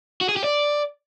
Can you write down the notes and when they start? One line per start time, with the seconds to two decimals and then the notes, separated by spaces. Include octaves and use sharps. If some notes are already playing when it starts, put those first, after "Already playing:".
0.21 F#4
0.29 G#4
0.36 G4
0.44 D5